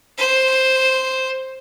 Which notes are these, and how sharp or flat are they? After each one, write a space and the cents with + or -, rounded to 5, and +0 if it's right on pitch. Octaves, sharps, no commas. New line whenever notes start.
C5 +0